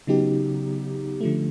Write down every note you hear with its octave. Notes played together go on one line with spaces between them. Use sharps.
C#3 F#3 B3 D#4 G4
D3 F3 A3